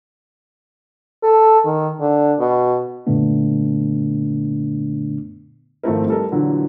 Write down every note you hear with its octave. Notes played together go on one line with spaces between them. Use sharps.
A4
D#3
D3
B2
F#2 A#2 D3 A3 B3 D4
G#1 F3 A3 C4 E4 A#4
G3 A4 A#4
A#2 D3 E3 F#3